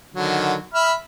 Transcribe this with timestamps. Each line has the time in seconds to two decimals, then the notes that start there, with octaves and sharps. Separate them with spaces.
0.15 D3 D#3 F#3
0.74 E5 B5 F6